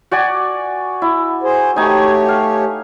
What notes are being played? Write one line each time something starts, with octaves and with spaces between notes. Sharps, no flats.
F#4 D5 G#5
E4
G#4 C5
A3 D#4 G4 C#5 G#5
F5